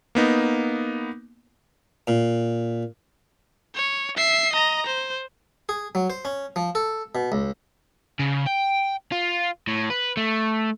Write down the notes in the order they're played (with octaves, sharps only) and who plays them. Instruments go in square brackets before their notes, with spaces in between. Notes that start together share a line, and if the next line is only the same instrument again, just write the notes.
[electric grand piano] A#3 B3 D#4
[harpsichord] A#2
[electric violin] C#5
E5 C7
D#5 A#5
C5
[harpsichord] G#4
F#3
C5
C#4
F3
A4
B2
C#2
[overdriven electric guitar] C#3
G5
F4
A2
B4
A3